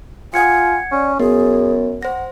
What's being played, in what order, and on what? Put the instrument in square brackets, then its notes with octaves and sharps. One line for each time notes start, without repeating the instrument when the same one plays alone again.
[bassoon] F4 [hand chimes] F#5 G#6 C#7 [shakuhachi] G#5
[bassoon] C#4 [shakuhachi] D5
[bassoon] F#2 [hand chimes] B3 [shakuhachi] G#4
[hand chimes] C5 A#6 [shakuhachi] F#5